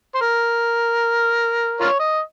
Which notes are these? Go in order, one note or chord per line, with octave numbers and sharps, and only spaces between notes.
C5
A#4
F4 A#4 C#5
D#5